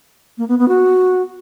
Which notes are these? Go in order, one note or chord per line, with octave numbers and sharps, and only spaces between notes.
A#3
B3
B3
F#4